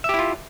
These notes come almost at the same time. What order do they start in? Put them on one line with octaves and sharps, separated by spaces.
E5 G4 E4 F4